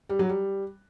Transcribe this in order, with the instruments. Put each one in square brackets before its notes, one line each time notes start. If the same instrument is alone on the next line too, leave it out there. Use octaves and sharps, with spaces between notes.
[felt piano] G3
F#3
G3